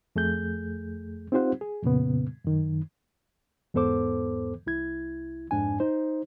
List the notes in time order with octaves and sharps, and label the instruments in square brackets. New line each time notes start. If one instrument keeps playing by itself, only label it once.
[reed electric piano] F2 A3 G#4 G6
C4 D#4 F4 G4 C5 F#5
G#4
F2 A#2 C#3 B3
F#2 D#3
E2 G#2 B3 A4 C5 D6
C2 E4 G#6
F2 G#2 D4 G#5
D#4 C5